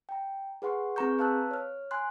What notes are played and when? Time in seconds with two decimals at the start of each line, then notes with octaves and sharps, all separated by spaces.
0.09 G5 A#5
0.62 G#4 B4 F#5 C6 C#6
0.96 C4 G#4 B4 A#5 C#6 G6
1.19 B4 F5 A5 E6 F#6
1.51 C#5 F6
1.91 G#5 C6 F#6